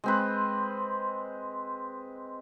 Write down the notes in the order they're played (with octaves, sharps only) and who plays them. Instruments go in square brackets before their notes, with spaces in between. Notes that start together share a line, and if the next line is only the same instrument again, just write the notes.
[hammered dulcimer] G#3 C4 B4